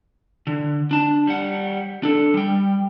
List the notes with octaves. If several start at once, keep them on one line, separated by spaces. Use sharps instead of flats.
D3
D4 A5
G3 F#5
D4 A4
G3 G5